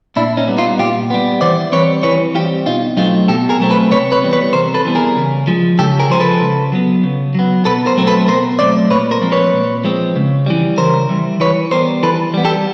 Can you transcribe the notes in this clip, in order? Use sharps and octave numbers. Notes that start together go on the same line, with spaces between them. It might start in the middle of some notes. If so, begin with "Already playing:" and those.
A#2 D4 E4
C#4 D#4
G3 B3
D#4 F4
A#2 F4 G4
G3 B3
E3 C5 D5
G3 C4 B4 C#5
E3 B4 C#5
G3 C4 F4 G4
B2 D#4 F4
F#3 A3 C4 D#4 F4
B2 G4 A4
G#4 A#4
F#3 A3 C4
A4 B4
C3 B4 C#5
B4 C#5
E3 G3 B3
B4 C#5
C3 A#4 C5
A4 B4
E3 G3 B3
G#4 A#4
C#3
F3 G#3
C#3 G4 A4
G#4 A#4
F3 G#3 C5
A4 B4
C#3
F#3 B3
C#3
F#3 B3
B2 A4 B4
A#4 C5
F#3 A3 C4
A4 B4
B2 A#4 C5
F#3 A3 C4 C5 D5
A#2 B4 C#5
A#4 C5
F3 G#3 C4
B4 C#5
A#2
F3 G#3 C4
C#3
E3 G3
C#3 A#4 C5
E3 G3
E3 B4 C#5
G3 B3 A#4 C5
E3 A4 B4
G3 B3
G4 A4